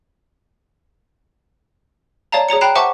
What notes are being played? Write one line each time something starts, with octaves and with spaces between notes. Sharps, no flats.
C#5 D5 F5 A5 A#5
G#4 C#5 A#5 C#7
G5 A#5 B5 F#6 C7 E7
C5 E5 F#5 A5 C#6 D6